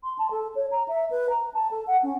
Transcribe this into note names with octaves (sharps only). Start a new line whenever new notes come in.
C6
A5
A4
C#5
A#5
E5
B4
A#5
A5
A4
F#5
C#4